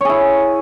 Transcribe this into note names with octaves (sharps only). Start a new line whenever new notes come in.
E4 G#4 C#5